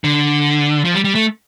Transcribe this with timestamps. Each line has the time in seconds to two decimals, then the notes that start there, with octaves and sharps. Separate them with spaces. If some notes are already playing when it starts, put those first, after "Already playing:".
0.04 D3
0.85 F3
0.94 G3
1.04 G3
1.15 A3